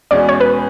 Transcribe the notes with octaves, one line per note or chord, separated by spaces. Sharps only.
E2 B2 G#3 C#4 D5
C#5
B4